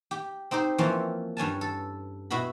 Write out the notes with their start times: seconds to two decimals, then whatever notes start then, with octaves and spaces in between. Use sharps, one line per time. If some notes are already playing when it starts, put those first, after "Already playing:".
0.11 G4
0.51 C4 D#4 G4 C5
0.78 E3 F3 A#3 C4 C#4
1.37 G2 C#4 G#5 A5
1.61 A4
2.30 B2 E4 F#4 B5